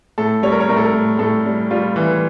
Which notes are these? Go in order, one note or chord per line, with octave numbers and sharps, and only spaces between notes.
A2 A4
G3 C#5
A#4
C#5
A2 A#4
A4
A#4
A2
A2 A4
G3
G3 F4
E3